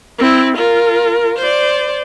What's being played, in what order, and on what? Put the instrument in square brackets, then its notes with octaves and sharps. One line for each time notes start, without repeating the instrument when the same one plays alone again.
[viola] C4 E4
F4 A#4
C5 D5